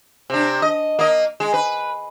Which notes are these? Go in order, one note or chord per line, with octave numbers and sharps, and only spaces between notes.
C3 D4
D#5
A#3 D#5
G#3
B4